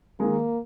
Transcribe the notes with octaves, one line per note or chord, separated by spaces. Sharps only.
D#3 G#3 A#3